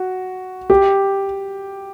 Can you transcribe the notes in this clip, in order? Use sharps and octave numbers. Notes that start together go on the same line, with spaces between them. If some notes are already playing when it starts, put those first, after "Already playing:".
Already playing: F#4
G4